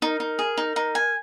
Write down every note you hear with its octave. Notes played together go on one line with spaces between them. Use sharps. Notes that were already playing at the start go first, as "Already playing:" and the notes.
D#4 A#4
D#4
G#4
D#4
D#4
G#5